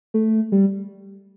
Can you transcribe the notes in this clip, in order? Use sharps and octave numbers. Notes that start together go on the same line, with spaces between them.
A3
G3